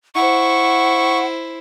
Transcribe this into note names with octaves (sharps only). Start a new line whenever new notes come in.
E4 C5 F#5 C#6